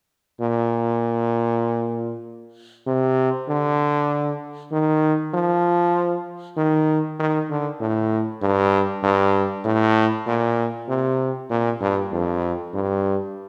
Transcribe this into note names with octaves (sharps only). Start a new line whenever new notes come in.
A#2
C3
D3
D#3
F3
D#3
D#3
D3
A2
G2
G2
A2
A#2
C3
A#2
G2
F2
G2